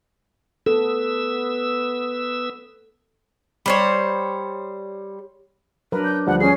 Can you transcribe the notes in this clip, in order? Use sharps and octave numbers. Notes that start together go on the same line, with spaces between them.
B3 A4 E6
G3 C5 C#5
F#3 D4 A#4 B4
G6
D2 F3 G3 F#5
C#4 G#4 C7